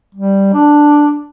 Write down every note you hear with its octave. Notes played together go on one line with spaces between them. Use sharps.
G3
D4